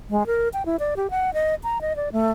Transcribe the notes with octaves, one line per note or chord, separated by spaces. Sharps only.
G#3
A#4
G5
E4
D5
G4
F#5
D#5
A#5
D#5
D5
A3